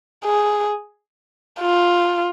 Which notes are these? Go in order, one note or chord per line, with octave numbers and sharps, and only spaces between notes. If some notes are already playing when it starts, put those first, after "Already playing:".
G#4
F4